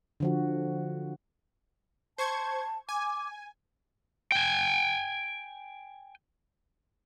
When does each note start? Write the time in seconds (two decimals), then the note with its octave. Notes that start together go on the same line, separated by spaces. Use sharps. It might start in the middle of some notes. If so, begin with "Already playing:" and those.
0.20 D3 F3 F#4
2.18 C5 A5 C#6 G#6
2.89 G#5 D6
4.32 G5 G#5